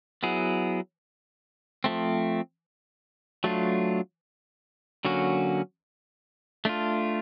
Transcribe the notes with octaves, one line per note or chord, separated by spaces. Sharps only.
F#3 B3 E4 G#4
F3 A3 C4
F#3 A3 D4 F4
D3 F#3 A#3 C#4 F#4
A3 D4 F4